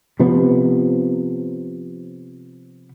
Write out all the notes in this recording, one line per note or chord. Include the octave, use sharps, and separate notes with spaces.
C3 F3 B3